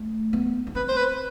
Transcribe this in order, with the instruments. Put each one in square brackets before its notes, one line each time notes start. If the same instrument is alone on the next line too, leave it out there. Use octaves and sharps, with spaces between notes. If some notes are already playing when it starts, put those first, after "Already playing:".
Already playing: [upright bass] A3
B3
C#4
[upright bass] C4 [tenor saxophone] B4
[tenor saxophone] C5
B4